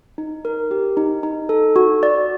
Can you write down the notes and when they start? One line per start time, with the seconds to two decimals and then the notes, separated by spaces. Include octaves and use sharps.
0.18 D#4
0.45 A#4
0.71 G4
0.97 D#4
1.23 D#4
1.49 A4
1.76 F#4
2.03 D5